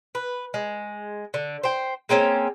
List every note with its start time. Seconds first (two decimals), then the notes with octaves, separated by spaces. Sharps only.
0.15 B4
0.54 G#3
1.34 D3
1.63 C5 G5
2.09 G#3 A#3 C4 C#4